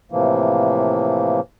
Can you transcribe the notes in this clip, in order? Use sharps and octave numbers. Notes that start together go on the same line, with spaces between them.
A2 C3 E3 F3 A#3